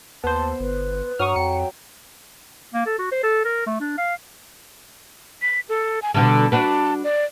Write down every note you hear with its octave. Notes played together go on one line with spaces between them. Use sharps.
D#2 B3 C5 A5
G1 B4
G2 F#3 C#6 D#6 F6
F2 G5 C#7
A#3
A4
F#4
C5
A4
A#4
A3
D4
F5
B6
A4
G#5
B2 D3 G3 A5
D4 F#4 B4 A5
D5